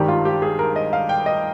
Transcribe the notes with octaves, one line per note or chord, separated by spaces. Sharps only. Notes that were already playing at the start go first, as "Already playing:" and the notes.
Already playing: G#1 G2 D#3 G3 G4
F4
G4
G#4
A#4
D#5
F5
G5
D#5